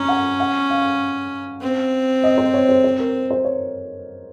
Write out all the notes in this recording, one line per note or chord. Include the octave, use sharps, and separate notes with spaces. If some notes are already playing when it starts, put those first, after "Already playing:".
Already playing: C#4 A#5
F#5
F#5
F5
C4
D#5
C5
C#5
C5
C5
A#4
C5
C#5